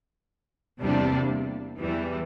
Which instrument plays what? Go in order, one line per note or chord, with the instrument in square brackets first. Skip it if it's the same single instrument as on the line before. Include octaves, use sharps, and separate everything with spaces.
[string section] E2 C3 G3 A#3 D4
E2 E3 G3